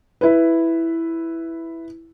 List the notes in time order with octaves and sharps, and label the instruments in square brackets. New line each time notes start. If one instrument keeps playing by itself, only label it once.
[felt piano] E4 B4